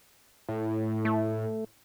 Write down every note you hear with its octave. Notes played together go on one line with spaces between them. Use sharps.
A2
A3